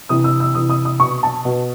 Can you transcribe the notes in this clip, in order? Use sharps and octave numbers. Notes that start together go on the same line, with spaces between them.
C3 E3 D#6
E6
E6
C3 E3 D#6
D#6
D#6
B2 C#6
A5
B2